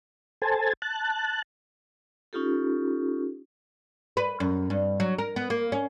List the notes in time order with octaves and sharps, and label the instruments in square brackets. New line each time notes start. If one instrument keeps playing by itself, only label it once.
[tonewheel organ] A4 C5 G#5 A5
A5 F#6
[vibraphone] C#4 D#4 F4 G4 A4
[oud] B4
F#2
G2
F#3
A#4
B3
A#3
C#4